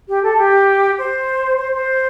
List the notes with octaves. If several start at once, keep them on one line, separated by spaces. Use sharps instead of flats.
G4
A4
G4
C5
C5
C5